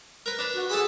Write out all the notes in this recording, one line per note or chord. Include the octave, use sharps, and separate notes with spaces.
A#4 B4
D4 B4
F#4
G#4 A4 F#5 B5